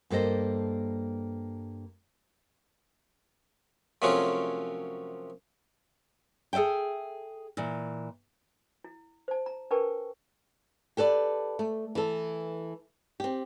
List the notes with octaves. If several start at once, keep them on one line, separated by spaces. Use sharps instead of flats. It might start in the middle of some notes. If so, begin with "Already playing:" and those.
G2 A#3 A4 C5 D#5
F#2 C3 F3 F#3 A3 C#4
G#4 A4 C5 E5 G5
A#2 E3
E4
C5 A5
A#5
D4 A#4 B4 G5 A5 C#6
G4 A4 B4 D5
A3
E3 A4
C4 G4